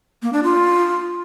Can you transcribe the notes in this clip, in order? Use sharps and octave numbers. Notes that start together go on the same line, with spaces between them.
A#3
D4
F4